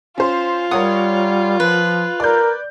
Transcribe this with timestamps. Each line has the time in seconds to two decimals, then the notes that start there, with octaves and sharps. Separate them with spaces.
0.18 C#4 F4 C5
0.71 G3 A#4 C#5 F#5 D#6
1.60 F3 B4
2.20 A#4 D5 G6